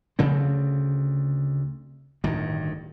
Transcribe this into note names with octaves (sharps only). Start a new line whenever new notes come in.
D2 C#3 A3 C4
D1 G2 D#3